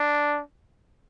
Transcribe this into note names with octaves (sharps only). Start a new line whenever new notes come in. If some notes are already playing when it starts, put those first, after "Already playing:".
Already playing: D4